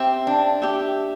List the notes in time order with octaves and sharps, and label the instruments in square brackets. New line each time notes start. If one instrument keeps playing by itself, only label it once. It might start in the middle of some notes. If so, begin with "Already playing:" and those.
Already playing: [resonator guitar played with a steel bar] C4 [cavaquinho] G4 E5 G5
[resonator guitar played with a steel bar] D4
[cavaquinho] G4 E5 G5